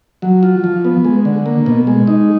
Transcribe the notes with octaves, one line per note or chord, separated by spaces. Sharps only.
F#3
F4
F3
B3
G#3
D3
A#3
B2
G#3
D#4